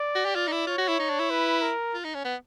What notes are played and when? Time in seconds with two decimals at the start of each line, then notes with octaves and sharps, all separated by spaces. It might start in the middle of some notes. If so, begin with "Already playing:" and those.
Already playing: D5
0.15 F#4
0.25 G4
0.35 F4 D5
0.47 D#4
0.52 E4
0.67 F4 C#5
0.78 F#4
0.88 E4
0.99 D#4
1.10 D4
1.19 E4
1.30 B4
1.62 A#4
1.94 F4
2.04 D#4
2.14 C#4
2.24 B3